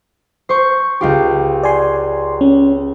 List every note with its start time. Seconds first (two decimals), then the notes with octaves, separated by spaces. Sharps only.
0.49 C5 C#6
1.01 C#2 F4 G4
1.63 D5 G#5 C6
2.41 C#4